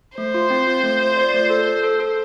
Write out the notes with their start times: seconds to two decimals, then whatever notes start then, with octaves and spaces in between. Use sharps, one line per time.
0.17 A3 C5
0.34 F4
0.50 C4
0.67 F4
0.84 A3
1.01 F4
1.17 D5
1.34 A3
1.50 A4
1.67 A4
1.83 A4
2.00 A4